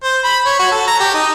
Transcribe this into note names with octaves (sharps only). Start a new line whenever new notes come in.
C5
B5
C#5
F#4
A4
A#5
G4
D#4